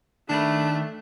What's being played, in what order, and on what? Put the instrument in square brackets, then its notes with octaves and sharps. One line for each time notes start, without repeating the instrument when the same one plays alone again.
[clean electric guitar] D#3 A5 B5 [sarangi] A3 [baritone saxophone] D4